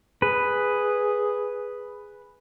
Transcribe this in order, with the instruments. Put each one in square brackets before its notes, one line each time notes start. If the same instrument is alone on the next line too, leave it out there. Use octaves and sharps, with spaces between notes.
[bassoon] G#4 [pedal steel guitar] B4